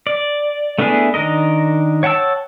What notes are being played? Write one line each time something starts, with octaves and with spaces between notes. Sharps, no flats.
D5
A3 B3 D4 E4 G#4
D#3 D4 A#4 D#5
C#5 F#5 G5 A5 E6